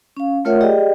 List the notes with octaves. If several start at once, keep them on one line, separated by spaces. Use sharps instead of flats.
C#4 F5
A3 F4 A#4 C#5 E5 F#5
G4 G#4 D5 D#5 G5